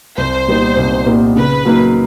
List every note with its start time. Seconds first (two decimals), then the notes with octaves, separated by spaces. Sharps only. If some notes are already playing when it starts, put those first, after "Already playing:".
0.17 C2 C5
0.47 A#2 G3 B3 D#4
0.77 C2
1.06 A#2 G3 B3 D#4
1.36 C#3 B4
1.65 F#3 A#3 D#4